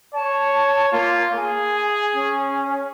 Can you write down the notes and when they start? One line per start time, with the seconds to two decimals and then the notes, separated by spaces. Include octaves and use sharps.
0.15 C#5 A5
0.92 A#3 F4
1.36 G#4 G#5
2.14 C#4